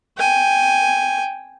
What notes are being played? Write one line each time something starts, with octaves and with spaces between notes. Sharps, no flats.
G5 G#5